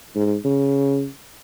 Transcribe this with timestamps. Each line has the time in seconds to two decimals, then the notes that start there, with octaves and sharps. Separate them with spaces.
0.15 G#2
0.45 C#3